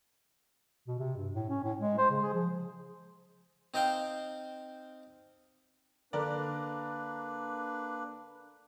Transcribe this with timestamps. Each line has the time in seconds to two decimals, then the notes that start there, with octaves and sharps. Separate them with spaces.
0.88 B2
0.99 C3
1.17 G2
1.34 A2
1.50 C#4
1.64 A2
1.79 G#3
1.98 C5
2.10 C#3
2.22 G#4
2.34 F3
3.74 C4 D#4 C5 F5 G5
6.13 D3 A#3 D4 A#4 B4 D5